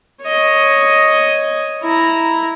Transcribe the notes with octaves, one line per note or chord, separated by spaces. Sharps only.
C#5 D#5
E4 A#5